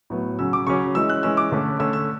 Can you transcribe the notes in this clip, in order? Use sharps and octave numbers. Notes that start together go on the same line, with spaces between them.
A2 F#3 B3
C#3 F#3 C#4 E6
D6
C#3 F#3 C#4 C#6
E3 G#3 C#4 E6
F#6
E3 G#3 C#4 E6
D6
D3 A3 C#4
D3 A3 C#4 E6
E6